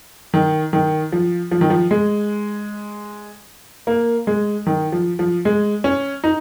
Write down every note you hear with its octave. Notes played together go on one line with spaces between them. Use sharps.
D#3
D#3
F3
F3
D#3
F3
G#3
A#3
G#3
D#3
F3
F3
G#3
C#4
D#4